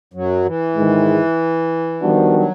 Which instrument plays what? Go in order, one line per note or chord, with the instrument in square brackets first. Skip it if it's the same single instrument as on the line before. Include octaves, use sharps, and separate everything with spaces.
[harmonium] F#2 F#3
E3
[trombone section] G#2 D#3 G#3
[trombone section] D#3 G3 B3 D4 F#4 [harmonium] F3
[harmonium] F#3